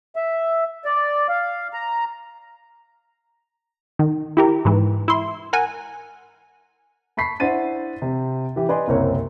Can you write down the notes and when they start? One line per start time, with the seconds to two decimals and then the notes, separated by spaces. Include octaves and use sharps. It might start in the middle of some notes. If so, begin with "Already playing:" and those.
0.16 E5
0.85 D5
1.29 F5
1.73 A#5
3.99 D#3
4.37 E4 G4 A#4
4.65 G#2 E3
5.08 E4 C6
5.53 A#4 F#5 G#5
7.17 A5 B5 C#6 B6 C7
7.40 D4 E4 C5 F#5 A6 D#7
8.02 C3
8.56 E3 G4
8.69 B4 D5 D#5 G#5 C6
8.88 F#1 C2 C4 A#4 C#5